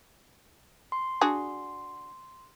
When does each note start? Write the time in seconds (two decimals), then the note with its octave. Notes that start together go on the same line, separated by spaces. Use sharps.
0.92 C6
1.21 D4 F#4 G#4